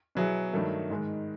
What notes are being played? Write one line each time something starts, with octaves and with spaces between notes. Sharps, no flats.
B2 F#3 B3 E4 G#4
G2 D#3 F#3 A3
G#2 D#3 G#3